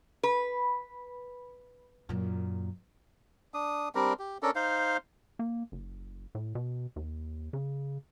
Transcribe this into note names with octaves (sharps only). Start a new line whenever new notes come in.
B4
F#2 A#2
D4 D#6
G3 C4 D4 A#4
G4
C#4 D4 A4 A#4
D#4 C5 F5
A#3
F#1
A2
B2
D#2
C#3